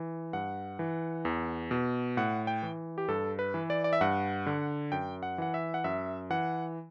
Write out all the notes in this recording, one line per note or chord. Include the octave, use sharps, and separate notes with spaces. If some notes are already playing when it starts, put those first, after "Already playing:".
Already playing: E3
G2 F#5
E3
E2
B2
A2 F#5
G5
E3
G4
G2 A4
B4
E3
D5
D5
E5
G2 F#5
D3
F#2 G5
F#5
E3 F#5
E5
F#5
F#2 E5
E3 F#5